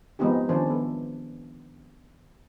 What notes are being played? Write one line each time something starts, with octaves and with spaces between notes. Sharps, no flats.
F3 G#3 B3 C4 D#4 G4
D#3 F3 C#4 D4 C5
B3 A4